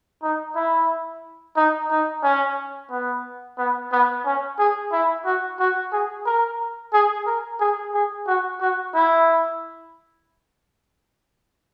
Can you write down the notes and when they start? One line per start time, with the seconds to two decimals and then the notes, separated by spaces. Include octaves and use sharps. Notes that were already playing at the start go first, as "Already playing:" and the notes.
0.23 D#4
0.56 E4
1.57 D#4
1.91 D#4
2.23 C#4
2.91 B3
3.58 B3
3.92 B3
4.25 C#4
4.59 G#4
4.92 E4
5.25 F#4
5.60 F#4
5.93 G#4
6.26 A#4
6.93 G#4
7.27 A#4
7.60 G#4
7.94 G#4
8.27 F#4
8.61 F#4
8.95 E4